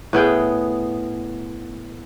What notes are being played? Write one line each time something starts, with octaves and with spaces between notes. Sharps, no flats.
A2 B3 G#4 G5